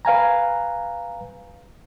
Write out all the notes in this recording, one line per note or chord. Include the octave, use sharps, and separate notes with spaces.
B4 F5 G#5 A#5